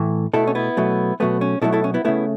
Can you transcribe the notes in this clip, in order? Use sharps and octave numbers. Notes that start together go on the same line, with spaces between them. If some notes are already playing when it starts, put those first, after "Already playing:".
Already playing: A2 E3 A3
B2 A3 E4 A4
C#4
B3 E4
B2 F#3 A3
B2 F#3 A3 B3
C#4
B2 F#3 A3 E4 A4
E4 A4
C#4
B3 E4
C#3 A3 B3 E4